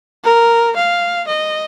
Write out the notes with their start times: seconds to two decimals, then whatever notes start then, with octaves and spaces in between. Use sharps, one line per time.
0.24 A#4
0.76 F5
1.27 D#5